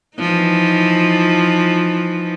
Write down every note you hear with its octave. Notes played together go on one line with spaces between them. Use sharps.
E3 F3 D#4